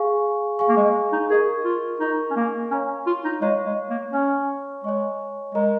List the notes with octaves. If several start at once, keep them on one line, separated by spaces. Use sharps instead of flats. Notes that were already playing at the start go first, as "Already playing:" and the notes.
Already playing: G#4 F5 G#5 C#6
G#4 F5 G#5 C#6
A#3
G#3
D#4
G#4 A#4 D#5 C#6
F4
D#4 A#4 D#5 C#6
C#4
A#3
C#4 C#5 F5 A#5 C#6
F4
D#4
G#3 C#5 F5 A#5 C#6
G#3
A#3
C#4 C#5 G#5 C#6
G#3 C#5 G#5 C#6
G#3 A#4 D#5 A#5